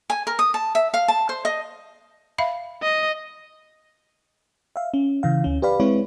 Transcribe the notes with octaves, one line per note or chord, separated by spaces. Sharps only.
G#5
A#4
D#6
A5
E5
F5
A5
C5
D#5
E5 F5 B5
D#5
E5 F5
C#4
C#3 E3 F5
D2 C#4
G4 B4 D5 F5 B5
G#3 C4 E4 B4 C#5